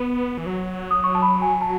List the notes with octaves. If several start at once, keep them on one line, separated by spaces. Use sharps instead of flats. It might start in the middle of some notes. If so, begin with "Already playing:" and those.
Already playing: B3
E3
F#3
D#6
C#6
A5
B5
G#5
A5